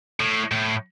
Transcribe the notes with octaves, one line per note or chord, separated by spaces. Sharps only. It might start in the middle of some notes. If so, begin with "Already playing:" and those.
A2
A2